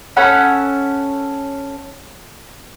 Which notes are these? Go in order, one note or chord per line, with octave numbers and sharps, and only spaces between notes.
C#4 A4 F#5 B5